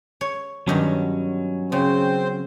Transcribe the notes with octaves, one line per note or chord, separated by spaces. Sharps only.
C#5
G2 D#3 F#3 B3 C#4
C#3 C4 C5